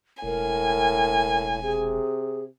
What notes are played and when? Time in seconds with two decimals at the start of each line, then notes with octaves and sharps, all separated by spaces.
0.23 E1 A2 A#4 G#5
1.63 C3 G#4